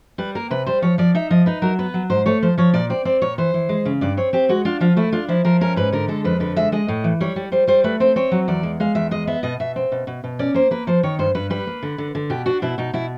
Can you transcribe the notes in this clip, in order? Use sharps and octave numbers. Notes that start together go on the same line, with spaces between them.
G3 B4
A#3 A#4
C3 B4
G3 C5
F3 C#5
F3 D5
D#4 E5
F3 D#5
D#4 B4
F#3 A#4
B3 B4
F#3
G#2 C5
A3 C#5
F3 C5
F3 C#5
A#2 D5
C4 D5
C4 D5
A#2 C#5
E3 C5
E3
G#3
C#3
G2 D5
C4 C#5
C4 G4
G#3 F#4
D4 F4
F3 F4
A3 E4
D4 F4
F3 E4
F3 A#4
C#4 A#4
G#2 B4
D3 A#4
G#3 A4
F2 B4
D3 B4
G#3 E5
G#3 D#5
A2
E3
G3 C#5
G3
G3 C5
G3 C5
A3 B4
C4 C5
C4 C#5
F#3
E2 D5
G#3
G#3 F5
E2 E5
G#3 D#5
B3 E5
B2 D#5
B2 E5
C4
B2
B2
B2
C#4 D5
A#3 C5
A#3 B4
F3 C5
D#3 C#5
G2 C5
G2 B4
G3 B4
A#3
D3
D3
D3
B2 G4
D4 F#4
B2 E4
B2 D#4
B2 E4